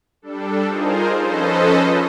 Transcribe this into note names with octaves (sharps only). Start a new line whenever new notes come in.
G3 D4 A4
D#4 F4 G#4 A#4 C5
F3 C#4 A4 B4 C5 D#5